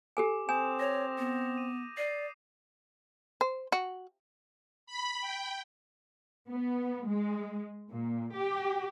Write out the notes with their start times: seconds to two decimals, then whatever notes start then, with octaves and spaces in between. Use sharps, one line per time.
0.17 G4 A4 G#5 D6
0.49 C4 G#5 D#6 G6 E7
0.80 C#5 A#6 F7
1.18 B3
1.57 D#7
1.97 D5 C7 D#7
3.41 C5
3.72 F#4
4.86 B5
5.21 G5
6.49 B3
7.07 G#3
7.91 A#2
8.34 G4